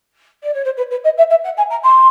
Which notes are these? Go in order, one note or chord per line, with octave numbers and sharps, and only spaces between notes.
D5
C#5
C5
B4
B4
D#5
E5
E5
F#5
G#5
A#5
C6